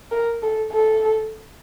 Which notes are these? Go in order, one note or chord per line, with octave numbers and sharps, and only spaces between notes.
A#4
A4
A4